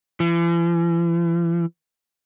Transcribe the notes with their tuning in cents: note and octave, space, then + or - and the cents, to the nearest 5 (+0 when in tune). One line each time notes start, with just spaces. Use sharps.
E3 +45